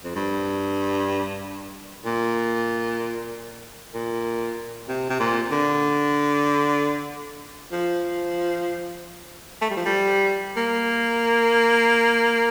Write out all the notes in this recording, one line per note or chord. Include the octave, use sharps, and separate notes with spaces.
F2
G2
A#2
A#2
C3
C3
A#2
D3
F3
A3
G3
F3
G3
A#3